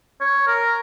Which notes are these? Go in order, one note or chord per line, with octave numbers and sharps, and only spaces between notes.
C#5
A#4